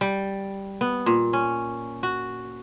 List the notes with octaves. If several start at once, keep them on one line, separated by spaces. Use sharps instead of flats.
G3
B3
A#2
C#4
F#4